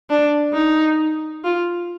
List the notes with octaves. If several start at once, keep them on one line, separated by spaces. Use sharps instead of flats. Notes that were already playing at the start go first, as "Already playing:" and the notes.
D4
D#4
F4